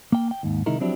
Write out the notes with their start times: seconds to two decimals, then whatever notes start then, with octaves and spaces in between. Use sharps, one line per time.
0.12 A#3 G5
0.31 G5
0.43 D#2 G#2
0.66 C3 D#3 G#3 D#4 E4 A#4
0.80 F3 F#3 C4 D4 E4 G4